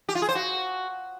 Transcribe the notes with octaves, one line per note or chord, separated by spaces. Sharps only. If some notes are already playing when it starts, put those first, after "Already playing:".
G4
F4
G#4
C5
F#4